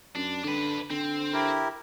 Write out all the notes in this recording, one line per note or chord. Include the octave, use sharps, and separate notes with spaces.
F#2 D4
D3 D4 B4
D3 C4
E4 G4 A#4